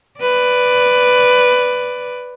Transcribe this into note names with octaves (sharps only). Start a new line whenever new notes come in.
B4 D5